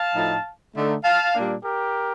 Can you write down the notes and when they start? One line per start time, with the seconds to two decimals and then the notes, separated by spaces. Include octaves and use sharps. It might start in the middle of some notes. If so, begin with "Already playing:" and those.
Already playing: F5 A5
0.15 A2 F3 A3 D#4
0.75 D3 A3 D#4
1.04 F5 A5
1.34 A#2 G3 A#3 D4
1.64 G4 A#4